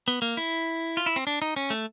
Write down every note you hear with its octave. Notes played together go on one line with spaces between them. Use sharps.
B3
A#3
E4
F4
E4
C4
D4
D#4
C#4
A3